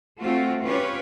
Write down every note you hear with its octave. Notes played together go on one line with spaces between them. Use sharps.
A3 C4 F4 F#4
C#4 F4 G4 B4 C#5